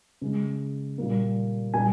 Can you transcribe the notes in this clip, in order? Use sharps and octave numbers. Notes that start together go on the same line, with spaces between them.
C#3 G#3
A#2 G3 A#3
A#2 G3 G#5